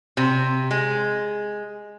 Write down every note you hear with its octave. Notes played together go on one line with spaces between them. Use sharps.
C3
G#3